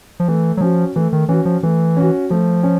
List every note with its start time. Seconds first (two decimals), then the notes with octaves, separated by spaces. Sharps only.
0.20 F3
0.28 E3 A3
0.57 F#3
0.61 F3 C#4 F#4
0.96 E3 A3
1.13 D#3
1.29 E3 C#4 F#4
1.45 F3
1.63 E3 A3
1.97 C#4 F#4
2.30 F3 A3
2.63 C#4